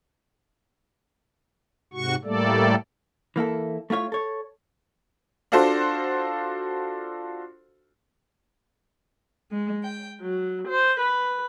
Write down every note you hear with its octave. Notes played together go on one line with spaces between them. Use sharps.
G#2 C3 F#4 C#6
A2 G3 A3 A#3 A4 D5
E3 A#3 E4 A4
A3 E4 F4 C#5
A4 C#5
D4 F4 F#4 A4 C5
G#3
G5
F#3
C5
B4